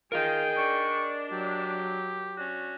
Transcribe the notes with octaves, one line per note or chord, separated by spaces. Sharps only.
F4 G#4 A#4 D#5 G5
D4 C#6
F#3 G4
C#4 D4 F#4